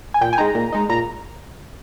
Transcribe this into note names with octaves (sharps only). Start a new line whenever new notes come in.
G#5
A#2 G5
G#5
G#3 D#4 A#5
A#2
G#3 D#4
A#2 A#5